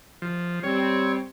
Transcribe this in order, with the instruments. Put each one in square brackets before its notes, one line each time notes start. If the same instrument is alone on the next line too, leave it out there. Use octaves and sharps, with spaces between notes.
[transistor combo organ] F3
[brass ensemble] G3 C4 [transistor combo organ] C#5